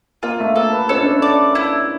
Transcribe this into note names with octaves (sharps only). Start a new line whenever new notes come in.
A#3 F4
A3
A#3 A4
B3
C#4 A4
D4
C#4
D5
E4